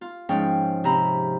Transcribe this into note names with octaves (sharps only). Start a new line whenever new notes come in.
F4
G#2 F3 C#4 G5
C3 C5 A#5 B5